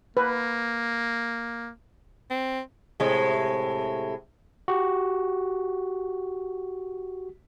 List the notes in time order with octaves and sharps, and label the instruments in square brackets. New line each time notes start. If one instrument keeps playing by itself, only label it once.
[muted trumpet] A#3 [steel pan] B4
[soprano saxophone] C4
[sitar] A2 C3 G#3
[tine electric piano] F#4 G4